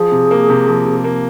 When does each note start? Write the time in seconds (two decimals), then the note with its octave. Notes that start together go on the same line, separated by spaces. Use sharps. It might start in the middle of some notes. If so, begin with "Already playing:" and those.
Already playing: F3 G#4
0.12 C3
0.31 A#3
0.49 C3
0.68 F3
0.85 C3
1.04 A#3